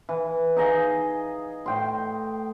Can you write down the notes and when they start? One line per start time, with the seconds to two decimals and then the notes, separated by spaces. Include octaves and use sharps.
0.09 E3
0.56 D#4 G#4 D#5 F5
1.66 A2 G5 C6